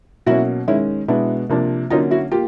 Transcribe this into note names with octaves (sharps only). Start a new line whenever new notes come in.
B2 F#3 A#3 C#4 E4 F#4
D#3 G#3 C#4 E4
B2 G#3 B3 D4 E4
C3 F3 A#3 D4
D3 F#3 A#3 C#4 D#4 F4
E4 F#4
A#3 F4 G4